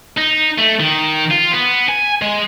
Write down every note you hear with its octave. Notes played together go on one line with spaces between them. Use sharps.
D#4
A3
D#3
F4
B3
G#5
G#3